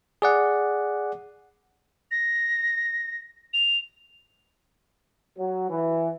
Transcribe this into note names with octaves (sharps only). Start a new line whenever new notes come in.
G#4 D5 F#5
A#6
F7
F#3
E3